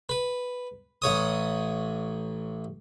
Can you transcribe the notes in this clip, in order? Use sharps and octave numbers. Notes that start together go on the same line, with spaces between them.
B4
A1 C#5 D#6